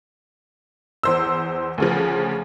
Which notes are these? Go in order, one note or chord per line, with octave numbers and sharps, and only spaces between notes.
E2 C5 E6
D2 C#3 F3